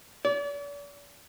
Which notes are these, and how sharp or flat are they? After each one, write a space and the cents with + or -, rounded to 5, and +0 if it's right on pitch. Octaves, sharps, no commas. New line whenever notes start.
D5 -40